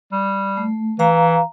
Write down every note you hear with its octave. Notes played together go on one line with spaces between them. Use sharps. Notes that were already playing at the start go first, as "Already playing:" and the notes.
G3
A3
E3 F5 A#5